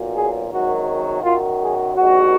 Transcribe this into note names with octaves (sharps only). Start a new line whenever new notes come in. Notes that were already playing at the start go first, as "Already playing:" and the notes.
Already playing: B1 A#2 F#3
G#4
G#1 F#2 D#3 F#3 F#4
F#2 D#3 F#3 F4
G#4
A#1 G#2 D#3 F#4